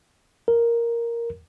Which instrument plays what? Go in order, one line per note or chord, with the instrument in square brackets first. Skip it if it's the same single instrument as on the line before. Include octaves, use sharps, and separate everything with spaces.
[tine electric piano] A#4